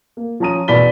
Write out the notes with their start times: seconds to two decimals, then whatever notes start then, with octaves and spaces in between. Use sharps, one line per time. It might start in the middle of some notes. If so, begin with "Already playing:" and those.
0.17 A#3
0.40 F3 C#4 A5 A#5 D#6 D#7
0.68 E2 B2 D5 B5 B6 G7